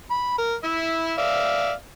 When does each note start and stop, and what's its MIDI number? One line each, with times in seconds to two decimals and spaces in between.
0.10 0.38 83
0.38 0.55 70
0.64 1.13 64
0.64 1.13 76
1.18 1.72 74
1.18 1.72 76
1.18 1.72 77